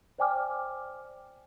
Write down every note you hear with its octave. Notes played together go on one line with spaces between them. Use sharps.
C5 D5 G5 G#5 D6 F6